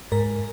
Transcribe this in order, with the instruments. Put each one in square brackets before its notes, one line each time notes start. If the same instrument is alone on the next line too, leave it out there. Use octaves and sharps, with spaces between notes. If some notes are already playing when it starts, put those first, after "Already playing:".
[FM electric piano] G#2 A#4